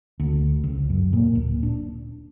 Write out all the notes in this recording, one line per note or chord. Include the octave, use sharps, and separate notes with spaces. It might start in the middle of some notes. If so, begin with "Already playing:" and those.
D2
C#2
F#2
A#2
D1
D4